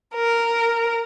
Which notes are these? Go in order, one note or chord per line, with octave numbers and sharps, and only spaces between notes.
A#4